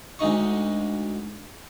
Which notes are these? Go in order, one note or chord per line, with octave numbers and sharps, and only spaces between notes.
D2 G#3 D#4 C#6